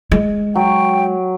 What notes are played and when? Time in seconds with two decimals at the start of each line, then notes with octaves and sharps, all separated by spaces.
0.12 G#3
0.55 F#3 G5